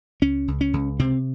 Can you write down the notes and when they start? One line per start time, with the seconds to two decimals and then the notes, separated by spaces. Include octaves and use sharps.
0.22 C#2 C#4
0.48 C#2
0.61 C#4
0.73 C#2
1.00 C3 C4